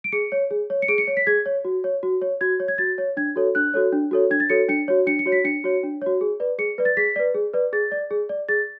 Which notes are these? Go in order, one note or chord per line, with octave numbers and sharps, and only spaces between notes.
D7
G#4 C#7
C#5
G#4
C#5
C#7
G#4 D7
C#7
C#5
B6
G#4 G#6
C#5
F#4
C#5
F#4
C#5
F#4 G#6
C#5
G#6
F#4 A6
C#5
D4 G#6
F#4 A4 C#5
D4 F#6
F#4 A4 C#5
D4
F#4 A4 C#5
D4 G#6
A6
F#4 A4 C#5 C#7
D4 C#7
F#4 C#5
D4 C#7
C#7
F#4 C#5
B6
D4 C#7
F#4 C#5
D4
F#4 C#5
G#4
B4 D5
G#4 C#7
B4 D5
A6
G#4 B6
B4 D5
G#4
B4 D5
G#4 A6
D5
G#4
D5
G#4 A6